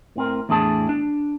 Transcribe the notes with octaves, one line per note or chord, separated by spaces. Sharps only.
A2 C4 A#4
E2 A2 D4 G#4 A5
D4